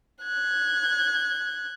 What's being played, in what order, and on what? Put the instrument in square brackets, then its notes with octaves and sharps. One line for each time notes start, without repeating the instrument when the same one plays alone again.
[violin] F#6 G#6